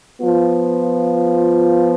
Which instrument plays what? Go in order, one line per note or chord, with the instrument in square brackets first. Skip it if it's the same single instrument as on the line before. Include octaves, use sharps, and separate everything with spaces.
[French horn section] F3 B3 F4